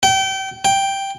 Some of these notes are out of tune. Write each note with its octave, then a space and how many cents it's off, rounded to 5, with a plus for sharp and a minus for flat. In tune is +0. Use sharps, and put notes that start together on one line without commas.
G5 -30
G5 +0